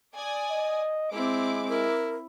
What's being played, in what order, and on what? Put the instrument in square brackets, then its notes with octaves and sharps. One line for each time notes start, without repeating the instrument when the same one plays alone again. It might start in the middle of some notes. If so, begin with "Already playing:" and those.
[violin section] D5 G#5 D#6
[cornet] D#5
[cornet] G#3 [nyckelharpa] C4 E4 [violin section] D6
[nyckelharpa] E4 [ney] A#4